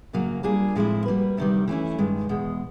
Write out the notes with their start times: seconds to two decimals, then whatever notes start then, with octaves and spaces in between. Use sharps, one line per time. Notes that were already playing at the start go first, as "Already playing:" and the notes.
0.13 F#2 C#3 F#3 A#3
0.43 G3 A#3 D4 F4 G#4
0.75 A2 F3 G#3 C4 E4
1.06 G3 A#3 C#4 F#4 B4
1.37 D2 C3 D#3 G3
1.68 E3 A3 C#4 E4
1.98 G2 D#3 G#3
2.29 E2 B2 G#3